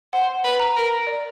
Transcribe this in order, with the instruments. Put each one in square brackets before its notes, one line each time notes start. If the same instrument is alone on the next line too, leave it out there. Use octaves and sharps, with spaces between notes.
[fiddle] C5 [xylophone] F#5
[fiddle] B4
[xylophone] A#5
[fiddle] A#4
[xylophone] D5